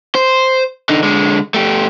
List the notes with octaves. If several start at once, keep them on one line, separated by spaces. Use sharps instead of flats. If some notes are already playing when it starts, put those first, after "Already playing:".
C5
D3 D#4
D3 G#3
A3 G4